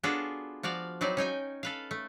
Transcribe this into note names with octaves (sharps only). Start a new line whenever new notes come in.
B3 D4 F4 F#4 G#4 A4
F3 F#4 D5 F5
F#3 C4 D#4 E4 D5
C#4 D#4 G5 G#5
A4 B4 F5
A3